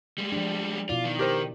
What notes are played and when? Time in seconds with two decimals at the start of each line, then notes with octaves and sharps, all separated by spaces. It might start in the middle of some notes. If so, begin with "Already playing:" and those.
0.18 G3 G#3
0.32 F3 D4
0.89 B2 E4 F4 D5
1.04 D#3
1.19 G4 A#4 C5